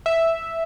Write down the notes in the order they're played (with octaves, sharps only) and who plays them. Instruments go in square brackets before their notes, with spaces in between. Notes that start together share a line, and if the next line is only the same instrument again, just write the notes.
[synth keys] E5